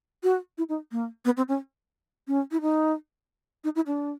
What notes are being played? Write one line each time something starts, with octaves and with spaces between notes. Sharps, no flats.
F#4
E4
D#4
A#3
B3
C4
C#4
C#4
E4
D#4
D#4
E4
D4